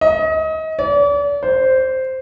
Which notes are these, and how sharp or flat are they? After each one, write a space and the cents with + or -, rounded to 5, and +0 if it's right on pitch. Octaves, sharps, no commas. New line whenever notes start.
D#5 +30
D5 -40
C5 -5